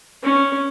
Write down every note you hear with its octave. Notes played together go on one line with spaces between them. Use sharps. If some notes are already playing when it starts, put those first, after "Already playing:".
C#4